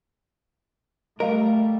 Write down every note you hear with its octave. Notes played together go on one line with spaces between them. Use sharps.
G3 A3 A#4 D#5 F5